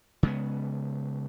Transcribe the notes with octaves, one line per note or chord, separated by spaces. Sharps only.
C#3 G#3 B3